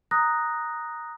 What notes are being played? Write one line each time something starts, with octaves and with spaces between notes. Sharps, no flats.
A#5 D#6 F#6 A#6